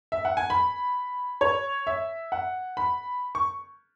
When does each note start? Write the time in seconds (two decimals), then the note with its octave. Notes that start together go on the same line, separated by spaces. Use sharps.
0.12 E5
0.25 F#5
0.37 G#5
0.50 B5
1.41 C#5
1.87 E5
2.32 F#5
2.77 B5
3.35 C#6